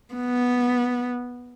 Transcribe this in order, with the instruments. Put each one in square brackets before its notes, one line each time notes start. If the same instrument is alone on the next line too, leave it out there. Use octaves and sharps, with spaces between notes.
[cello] B3